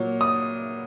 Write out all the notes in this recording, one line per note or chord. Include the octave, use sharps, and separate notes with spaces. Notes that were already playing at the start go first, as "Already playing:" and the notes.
Already playing: A#2 F#3
D#6